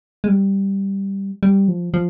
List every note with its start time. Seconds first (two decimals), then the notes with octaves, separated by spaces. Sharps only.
0.24 G#3
0.28 G3
1.43 G3
1.68 F3
1.94 F3